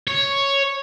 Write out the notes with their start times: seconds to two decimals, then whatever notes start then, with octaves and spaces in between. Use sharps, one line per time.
0.07 C#5